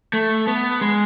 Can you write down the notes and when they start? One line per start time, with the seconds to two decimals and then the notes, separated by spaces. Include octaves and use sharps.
0.13 A3
0.47 B3
0.81 G#3